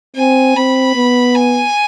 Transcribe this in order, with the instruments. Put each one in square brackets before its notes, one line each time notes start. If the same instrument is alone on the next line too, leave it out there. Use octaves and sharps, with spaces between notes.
[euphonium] C4 [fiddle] G#5
[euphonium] C4 [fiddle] B5
[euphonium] B3
[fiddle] G#5